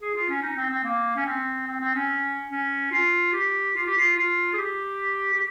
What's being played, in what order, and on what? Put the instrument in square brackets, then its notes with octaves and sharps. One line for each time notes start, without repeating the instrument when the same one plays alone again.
[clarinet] G#4
F4
C#4
D#4
C4
C4
A#3
C#4
C4
C4
C4
C#4
C#4
F4
G4
F4
G4
F4
F4
G#4
G4
G4